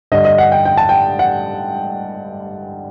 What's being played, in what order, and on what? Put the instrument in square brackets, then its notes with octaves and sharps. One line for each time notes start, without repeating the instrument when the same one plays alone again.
[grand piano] G2 D3 D#5
D#5
F#5
G5
G5
A5
G5
F#5